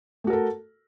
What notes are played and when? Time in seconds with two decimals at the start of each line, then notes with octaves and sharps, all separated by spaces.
0.24 A3
0.27 F#4
0.30 A#4
0.33 A4